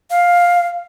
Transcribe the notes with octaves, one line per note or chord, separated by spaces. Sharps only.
F5